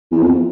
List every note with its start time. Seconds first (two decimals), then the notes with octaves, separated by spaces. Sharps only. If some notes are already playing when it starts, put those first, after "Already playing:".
0.12 E2
0.21 F2